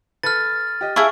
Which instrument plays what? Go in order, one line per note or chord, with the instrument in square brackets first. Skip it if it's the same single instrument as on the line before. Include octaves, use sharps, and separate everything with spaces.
[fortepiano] A4 B4 [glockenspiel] F6 A6
[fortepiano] G4 D#5
[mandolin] E4 G#4 [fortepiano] F5 A5 B5 [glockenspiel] C#6